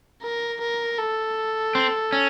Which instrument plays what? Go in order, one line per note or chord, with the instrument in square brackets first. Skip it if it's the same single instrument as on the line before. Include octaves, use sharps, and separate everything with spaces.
[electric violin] A#4
A#4
A4
[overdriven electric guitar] C4
C#4